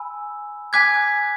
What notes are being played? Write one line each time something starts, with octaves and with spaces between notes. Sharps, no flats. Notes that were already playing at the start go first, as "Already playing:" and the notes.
Already playing: G#5 B5 E6
G#5 D6 F#6 G#6 B6